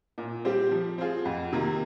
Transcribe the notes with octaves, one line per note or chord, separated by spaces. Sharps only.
A#2
G3 C4 G4
F3
C4 F4 G#4
F2
C3 D#3 A#3